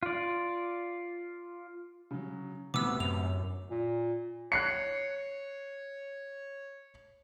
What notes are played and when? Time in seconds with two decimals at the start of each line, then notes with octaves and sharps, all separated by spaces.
0.03 F4 D5
2.11 C#3 F#3
2.74 D2 A2 C3 B3 D6 E6
3.00 F#2 F7
3.70 A#2
4.52 C#5 F#6 C7 C#7